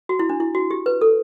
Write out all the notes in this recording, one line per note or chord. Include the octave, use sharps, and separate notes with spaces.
F#4
E4
D4
E4
F#4
G4
B4
A4